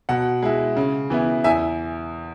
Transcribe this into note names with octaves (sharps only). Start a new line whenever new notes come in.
B2 F#5
G#3 E4
C#3
E3 B3 E4
E2 E5 G#5